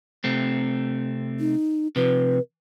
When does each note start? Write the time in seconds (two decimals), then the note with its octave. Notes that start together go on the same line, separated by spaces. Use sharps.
0.24 C3 A3 C4
1.40 D#4
1.96 C3 F3 B4